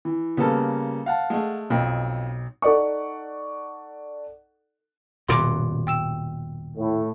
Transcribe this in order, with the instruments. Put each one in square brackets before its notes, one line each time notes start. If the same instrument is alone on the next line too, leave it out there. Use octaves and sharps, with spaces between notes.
[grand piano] E3
[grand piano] C#3 G3 A#3 [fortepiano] B3 A4
[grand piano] F5 F#5 A5
[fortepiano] G#3 A3
[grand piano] B1 [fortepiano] F2
[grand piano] D#4 A4 D5 F#5 C#6
[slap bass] D#1 F#2 B2 [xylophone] C6 D6
[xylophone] G5 E6 E7
[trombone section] A2